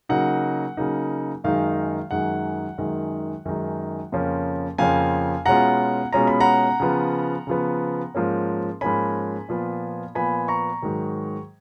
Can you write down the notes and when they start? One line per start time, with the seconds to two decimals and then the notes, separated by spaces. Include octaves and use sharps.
0.09 C#3 F#3 A#3 D#4 F#5
0.77 C#3 F#3 A#3 D#4
1.44 F#2 D#3 G#3 D#4 F5
2.11 F#2 D#3 G#3 D#4 F#5
2.78 F#2 D#3 G#3 D#4
3.45 F#2 D#3 G#3 D#4
4.12 F2 C#3 F3 A#3 C#4
4.78 F2 C#3 F3 A#3 C#4 F5 G#5
5.45 B2 G#3 C#4 F4 F#5 A#5
6.13 B2 G#3 C#4 F4 A#5
6.27 B5
6.40 F#5 A#5
6.80 C#3 F3 B3
7.47 C#3 F3 B3
8.15 G#2 F3 A#3 C#4
8.81 G#2 F3 A#3 C#4 G#5 B5
9.49 A#2 F3 B3 F4
10.15 A#2 F3 B3 F4 G#5 B5
10.48 A#5 C#6
10.82 G#2 D#3 F#3